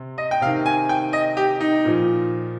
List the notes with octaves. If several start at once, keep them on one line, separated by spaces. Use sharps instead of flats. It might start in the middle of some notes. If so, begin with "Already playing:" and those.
Already playing: C3
D#5
G5
C3 D#3 F5
G#5
G5
D#5
G4
D#4
A#2 F3